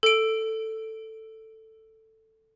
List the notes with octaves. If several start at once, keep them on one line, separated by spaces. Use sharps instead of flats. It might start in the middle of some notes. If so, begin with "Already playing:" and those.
A4 D7